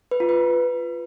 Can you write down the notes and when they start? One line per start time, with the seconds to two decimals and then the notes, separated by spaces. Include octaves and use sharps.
0.11 B4
0.20 F4
0.29 B4